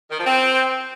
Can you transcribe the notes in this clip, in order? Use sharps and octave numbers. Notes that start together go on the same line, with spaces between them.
D#3
F3
C4